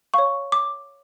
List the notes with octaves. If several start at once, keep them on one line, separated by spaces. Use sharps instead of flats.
C#5 F5 C#6
D6